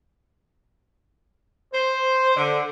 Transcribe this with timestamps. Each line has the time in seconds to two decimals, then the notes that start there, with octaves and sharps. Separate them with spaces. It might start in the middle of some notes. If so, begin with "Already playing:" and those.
1.73 C5
2.36 D3